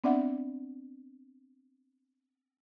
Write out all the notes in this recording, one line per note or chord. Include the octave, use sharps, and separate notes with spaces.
B3 C4 D4 D5 E5 F#5